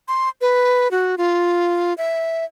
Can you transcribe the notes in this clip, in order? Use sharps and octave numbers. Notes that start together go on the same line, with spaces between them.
C6
B4
F#4
F4
E5